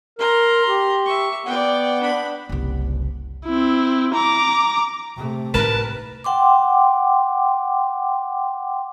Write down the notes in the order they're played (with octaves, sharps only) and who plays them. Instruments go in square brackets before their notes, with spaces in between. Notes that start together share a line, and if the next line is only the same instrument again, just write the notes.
[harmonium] A#4 [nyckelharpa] A#5 C6
[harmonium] G4
[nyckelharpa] E5 C#6
[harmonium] B3 F#5 [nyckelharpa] D5 G5
[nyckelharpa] D4 B5
[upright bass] F#1 C2
[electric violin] C4 E4
A#5 D6
[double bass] C3 A3
[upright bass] A2 D#4 [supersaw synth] A#4 B4 [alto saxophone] A5
[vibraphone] F#5 G5 C6 D6